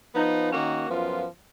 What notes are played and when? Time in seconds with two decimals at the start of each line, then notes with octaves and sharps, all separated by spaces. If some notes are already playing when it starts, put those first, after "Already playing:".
0.14 F3 B3 D#4
0.51 D#3 A#3 C#4 F#4
0.89 F#2 F3 B3 F4